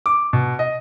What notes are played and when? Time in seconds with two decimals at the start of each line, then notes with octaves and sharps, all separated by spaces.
0.06 D6
0.33 B2
0.59 D#5